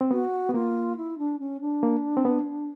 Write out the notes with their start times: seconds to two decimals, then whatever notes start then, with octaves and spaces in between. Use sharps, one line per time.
0.01 C4
0.11 B3 F#4
0.49 B3
0.54 A#3 F4
0.97 E4
1.18 D4
1.39 C#4
1.61 D4
1.83 A#3
2.17 C4
2.25 B3